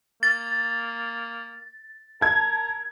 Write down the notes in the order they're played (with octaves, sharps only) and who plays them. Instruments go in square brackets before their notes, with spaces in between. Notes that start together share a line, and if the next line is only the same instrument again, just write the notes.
[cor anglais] A#3 [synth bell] A6
[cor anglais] A#4 [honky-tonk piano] A5 G#6